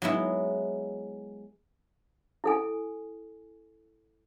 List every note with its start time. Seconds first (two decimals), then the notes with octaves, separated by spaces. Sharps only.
0.02 F#3 G#3 B3 E4
2.44 E4 A4 G#5